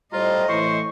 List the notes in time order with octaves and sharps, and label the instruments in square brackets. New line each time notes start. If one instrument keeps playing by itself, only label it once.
[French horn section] A2 G3 C5 [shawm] F4 [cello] D#5 [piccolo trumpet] A#5
[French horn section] A2 E3 [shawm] C5 [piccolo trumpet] C#6